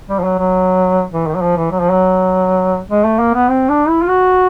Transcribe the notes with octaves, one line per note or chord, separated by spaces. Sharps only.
G3
F3
F#3
F#3
E3
D#3
F#3
F3
E3
F#3
F3
F#3
G#3
A3
A#3
B3
C4
D4
E4
F4
F#4